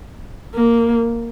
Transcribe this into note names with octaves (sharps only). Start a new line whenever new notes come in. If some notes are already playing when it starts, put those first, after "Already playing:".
A#3